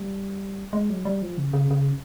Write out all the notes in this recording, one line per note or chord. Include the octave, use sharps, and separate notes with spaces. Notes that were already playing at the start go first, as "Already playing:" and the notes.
Already playing: G3
G#3
F#3
G3
F3
C#3
C#3
C#3